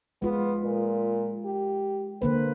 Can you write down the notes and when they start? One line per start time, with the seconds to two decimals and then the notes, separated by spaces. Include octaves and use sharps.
0.22 G#3 B3 F4
0.64 A#2
1.46 G4
2.22 D3 A#3 B4 C5